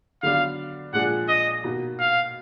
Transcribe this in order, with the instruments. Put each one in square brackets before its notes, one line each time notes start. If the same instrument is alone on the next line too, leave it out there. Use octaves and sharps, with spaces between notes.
[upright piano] D3 F#3 B3 D4 [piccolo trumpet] F5
[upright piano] A#2 F3 G#3 D4 G#4 [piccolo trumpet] F#5
[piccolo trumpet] D#5
[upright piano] B2 A#3 D#4 F#4
[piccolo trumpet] F5